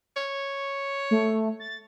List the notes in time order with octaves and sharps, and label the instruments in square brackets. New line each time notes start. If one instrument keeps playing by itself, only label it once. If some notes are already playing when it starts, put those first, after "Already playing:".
[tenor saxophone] C#5
[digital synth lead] A3
A6